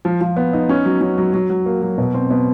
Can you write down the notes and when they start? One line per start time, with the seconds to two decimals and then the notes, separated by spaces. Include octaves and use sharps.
0.05 F3
0.21 F3
0.36 B3
0.53 D#4
0.69 C#4
0.85 F#3
1.01 C#4
1.18 F#3
1.34 F#3
1.50 F#3
1.66 A#3
1.82 F#3
1.98 B2
2.14 C4
2.30 B2